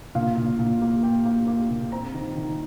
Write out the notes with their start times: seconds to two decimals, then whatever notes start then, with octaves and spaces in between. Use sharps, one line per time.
0.15 A#2 F5
0.37 A#2
0.59 A#2
0.81 A#3
1.03 A#3 G5
1.25 A#3
1.47 A#3
1.70 A#2
1.92 C4 A#5
2.14 D#3
2.36 D#3